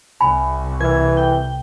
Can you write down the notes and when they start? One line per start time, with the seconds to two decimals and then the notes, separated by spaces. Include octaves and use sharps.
0.21 C2 G#5 B5
0.81 E3 A#4 B4 G#6
1.17 A4 G5